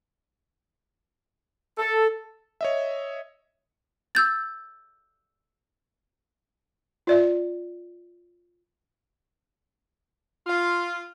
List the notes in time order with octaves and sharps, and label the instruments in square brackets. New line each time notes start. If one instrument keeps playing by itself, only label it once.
[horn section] A4
[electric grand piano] C#5 D#5 E5
[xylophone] E6 G6 A6
[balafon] F4 D5 E5
[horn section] F4